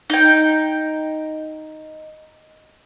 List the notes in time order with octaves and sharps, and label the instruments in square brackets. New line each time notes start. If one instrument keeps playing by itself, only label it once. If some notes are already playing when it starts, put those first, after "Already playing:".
[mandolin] D#4 G5